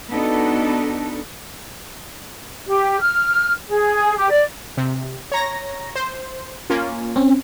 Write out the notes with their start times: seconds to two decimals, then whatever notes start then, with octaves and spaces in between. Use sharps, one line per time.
0.13 B3 D4 D#4 F#4 A4
2.66 G4
3.01 F6
3.68 G#4
4.17 G4
4.29 D5
4.77 C3
5.32 C#5 A#5 A#6
5.95 C5
6.70 A#3 C#4 F4
7.16 C4 C#4